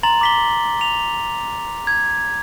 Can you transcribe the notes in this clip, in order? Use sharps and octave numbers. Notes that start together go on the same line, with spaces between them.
A#5 C6 A6 F#7
D6 B6 G7
F7
G#6